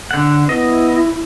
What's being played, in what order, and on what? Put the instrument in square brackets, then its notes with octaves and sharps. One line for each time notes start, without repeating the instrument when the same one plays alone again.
[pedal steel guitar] D3 F#5
[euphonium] B3 [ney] E4 [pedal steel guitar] D#5